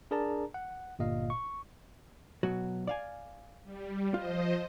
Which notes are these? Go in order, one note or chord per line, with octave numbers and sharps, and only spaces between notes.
D4 G#4 A#4 D5 A5 A#5
F#5
G1 A#2 D#5 F5
C#6
B2 F#3 F#4
D5 F5 G#5
G3
F3 F4 C5 D#5